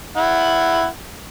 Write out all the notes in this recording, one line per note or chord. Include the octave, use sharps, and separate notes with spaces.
E4 F#5